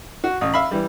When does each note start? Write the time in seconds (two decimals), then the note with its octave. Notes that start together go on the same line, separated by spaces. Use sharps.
0.24 F#4
0.41 A1 D#6
0.54 E5 F5 B5
0.71 E3 G3